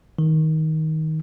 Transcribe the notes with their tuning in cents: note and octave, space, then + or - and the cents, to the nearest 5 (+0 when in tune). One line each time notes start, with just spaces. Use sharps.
D#3 +15